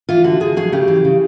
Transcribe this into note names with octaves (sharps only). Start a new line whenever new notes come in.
E3 F4
D3 F#4
D3 G#4
F#3 G#4
C#3 G4
E3
C#3